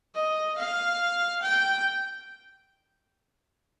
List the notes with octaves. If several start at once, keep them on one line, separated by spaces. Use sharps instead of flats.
D#5
F5
G5